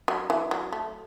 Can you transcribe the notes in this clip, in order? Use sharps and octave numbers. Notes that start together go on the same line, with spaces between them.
F#3
E3
F#3
A3